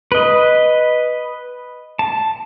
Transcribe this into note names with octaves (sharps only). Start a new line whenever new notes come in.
B4 D#5
A5